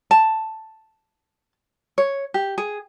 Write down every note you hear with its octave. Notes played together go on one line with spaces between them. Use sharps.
A5
C#5
G4
G#4